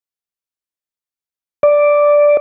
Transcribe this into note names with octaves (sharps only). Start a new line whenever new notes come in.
D5